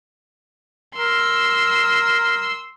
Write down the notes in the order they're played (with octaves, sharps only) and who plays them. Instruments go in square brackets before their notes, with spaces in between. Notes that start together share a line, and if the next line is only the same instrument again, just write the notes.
[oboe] A#4 [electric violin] C6 E6